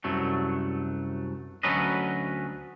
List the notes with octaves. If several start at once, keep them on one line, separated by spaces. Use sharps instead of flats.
C2 F#2 F#3 A3
D2 F#3 C#4 A4 B4 D#5